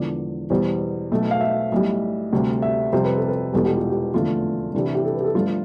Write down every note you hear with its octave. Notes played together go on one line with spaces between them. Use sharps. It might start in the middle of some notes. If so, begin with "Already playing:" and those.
Already playing: E1 E2 D3 F3 D5
E2 B2 G3 C5
B1 B2 A3
F5
E5
B1 A2 G3
D2 C3 G3
E5
F2 C3 G3 C5
B4
A4
B4
E1 E2 B2 G3 A4
G4
F4
G4
F1 E2 D3 A3 F4
C2 C3 E3 G3 D4
E4
G4
A4
B4
G4
A4
G1 G2 F3 A3 F4